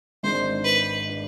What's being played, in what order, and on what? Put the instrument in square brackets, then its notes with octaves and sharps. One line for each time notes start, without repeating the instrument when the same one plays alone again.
[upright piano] G#1 G#2 G#3 D4 [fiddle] C5
[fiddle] B4
[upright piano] G#3 D4